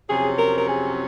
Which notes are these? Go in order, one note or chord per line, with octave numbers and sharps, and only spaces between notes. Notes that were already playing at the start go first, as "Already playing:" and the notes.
F2 C3 F#3 C#4 G#4
A#4
A#4
G#4